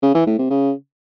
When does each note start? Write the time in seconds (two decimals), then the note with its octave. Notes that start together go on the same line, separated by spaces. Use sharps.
0.03 C#3
0.15 E3
0.26 A2
0.38 C3
0.50 C#3